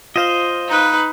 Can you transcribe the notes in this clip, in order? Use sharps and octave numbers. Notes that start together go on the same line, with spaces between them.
F4 C5 D#5 F5
D#4 B4